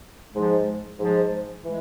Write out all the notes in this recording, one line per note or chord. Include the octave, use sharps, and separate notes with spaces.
G#2 F3 G#3
G#2 F3 G#3
E3 G#3